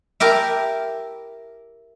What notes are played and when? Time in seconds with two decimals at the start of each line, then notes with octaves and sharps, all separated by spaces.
0.20 E4 G4 A#4 A5